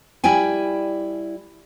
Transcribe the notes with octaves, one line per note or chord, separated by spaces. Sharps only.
G3 E4 D5 G5 G#5